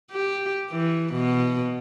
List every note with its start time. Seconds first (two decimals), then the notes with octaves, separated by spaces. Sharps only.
0.11 G4
0.71 E3
1.13 B2